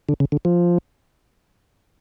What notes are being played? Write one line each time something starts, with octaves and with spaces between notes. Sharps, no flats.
D3
C#3
D3
F3